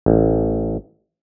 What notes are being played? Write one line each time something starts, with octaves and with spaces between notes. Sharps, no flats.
A1